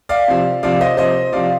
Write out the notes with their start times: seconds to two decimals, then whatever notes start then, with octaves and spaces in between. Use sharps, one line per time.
0.09 D5 F5
0.28 C3 F3
0.63 C3 F3 D5 F5
0.81 C5 D#5
0.97 C3 F3 C5 D#5
1.32 C3 F3 D5 F5